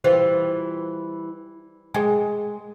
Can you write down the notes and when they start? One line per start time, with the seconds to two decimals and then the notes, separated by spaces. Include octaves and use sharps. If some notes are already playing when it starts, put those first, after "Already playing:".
0.04 E3 G3 F4 C5
1.94 G#3 G#4 G5 G#5